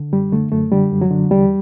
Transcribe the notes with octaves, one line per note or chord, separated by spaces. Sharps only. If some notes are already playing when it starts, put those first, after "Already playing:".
Already playing: D3
F#2 G3
D3 A3
F#2 A3
D3 G3
F#2
F#3
D3
E2 G3